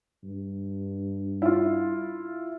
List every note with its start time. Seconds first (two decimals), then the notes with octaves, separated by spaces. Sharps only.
0.24 G2
1.42 E4 F4